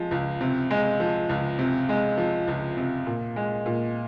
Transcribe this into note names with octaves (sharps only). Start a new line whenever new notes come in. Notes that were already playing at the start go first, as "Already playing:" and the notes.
Already playing: F3 G#3
C#2
C3
G#3
F3
C#2
C3
G#3
F3
C#2
C3
A#2
G#3
A#2